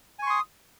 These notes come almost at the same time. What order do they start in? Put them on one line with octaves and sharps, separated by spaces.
G#5 C#6 C6 D#6